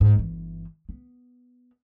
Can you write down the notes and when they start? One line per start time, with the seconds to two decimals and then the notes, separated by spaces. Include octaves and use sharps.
0.01 G#2
0.16 G1 E3
0.89 B3